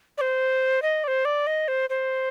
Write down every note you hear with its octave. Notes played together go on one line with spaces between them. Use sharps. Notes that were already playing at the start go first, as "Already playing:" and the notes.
D5
C5
D#5
D5
C5
D5
D#5
C5
C5